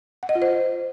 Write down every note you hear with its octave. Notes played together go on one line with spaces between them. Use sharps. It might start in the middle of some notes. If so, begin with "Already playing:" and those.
F#5
D#5
F4
C5